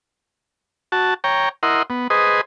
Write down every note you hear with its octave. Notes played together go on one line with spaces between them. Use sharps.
F#4 A5
C#5 G5 A#5
E4 A#4 D#5 F#5 C6
B3
G#4 B4 C5 D#5